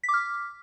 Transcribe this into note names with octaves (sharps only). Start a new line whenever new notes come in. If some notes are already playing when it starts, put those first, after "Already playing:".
B6
D6
F6